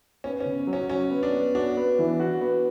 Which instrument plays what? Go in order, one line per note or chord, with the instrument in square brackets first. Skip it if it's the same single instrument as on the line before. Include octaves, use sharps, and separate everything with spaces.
[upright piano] B3 [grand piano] C#4
[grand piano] C#4
[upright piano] C#3
F#3
[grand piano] C#4
[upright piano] F#3 [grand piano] C#4
[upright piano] B3
[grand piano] D4
[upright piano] B3
[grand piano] D4 [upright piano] F#4
[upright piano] B3
E3
F#4
B3